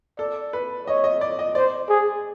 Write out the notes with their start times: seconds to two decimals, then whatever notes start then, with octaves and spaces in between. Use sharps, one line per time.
0.19 A4 D5
0.53 B4
0.87 C#5 D#5
1.04 D#5
1.21 D5
1.39 D#5
1.55 C5 D5
1.89 G#4